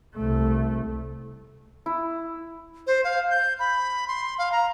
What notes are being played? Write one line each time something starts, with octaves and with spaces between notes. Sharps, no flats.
C2 A3
E4
C5
F5
G6
B5
C6
F5
A#5